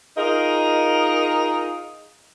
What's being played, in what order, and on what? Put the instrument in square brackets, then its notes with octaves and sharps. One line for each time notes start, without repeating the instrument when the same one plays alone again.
[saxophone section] D#4 F4 G#4 A#4 D#5